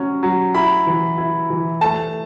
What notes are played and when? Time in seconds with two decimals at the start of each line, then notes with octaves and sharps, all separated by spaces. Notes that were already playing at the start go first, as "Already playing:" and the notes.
Already playing: F#3 C#4
0.23 F#3
0.54 E4 B5
0.87 E3
1.18 E4
1.50 E3
1.81 A3 A5